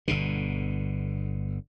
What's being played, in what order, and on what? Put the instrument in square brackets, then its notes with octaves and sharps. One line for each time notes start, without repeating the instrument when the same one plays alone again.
[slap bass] G1 B2 D3